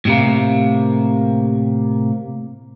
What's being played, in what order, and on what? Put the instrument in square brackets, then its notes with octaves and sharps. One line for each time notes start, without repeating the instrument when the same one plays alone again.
[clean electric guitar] A2 C3 A#3